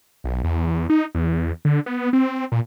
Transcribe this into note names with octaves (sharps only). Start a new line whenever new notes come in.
B1
E2
E2
D#4
E2
D3
B3
C4
A#2